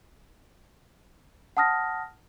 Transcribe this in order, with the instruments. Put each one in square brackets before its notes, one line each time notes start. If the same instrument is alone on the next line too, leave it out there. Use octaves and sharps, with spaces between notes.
[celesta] F#5 A5 D#6 F6 A#6